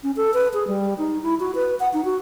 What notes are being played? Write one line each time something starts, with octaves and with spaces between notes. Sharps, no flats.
C#4
A4
B4
G#4
G3
D#4
E4
F#4
B4
F#5
D#4
F#4